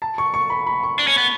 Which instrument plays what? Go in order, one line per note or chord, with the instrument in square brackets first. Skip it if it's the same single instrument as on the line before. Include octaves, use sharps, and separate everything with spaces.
[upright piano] A5
C#6
C#6
B5
B5
C#6
[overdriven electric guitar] D4
C#4
B3